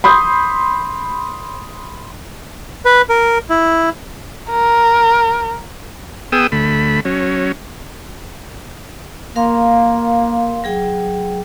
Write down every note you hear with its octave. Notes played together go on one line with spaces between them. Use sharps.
B5 C6 D#6 G6
B4
A#4
E4
A#4
B3 G#4 G5 D#6 E6
D2 A3 B5
F#3 C#4
A#3 A#4 F5 C6
F#3 G#4 G5